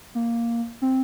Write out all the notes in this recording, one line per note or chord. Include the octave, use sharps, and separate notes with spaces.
A#3
C4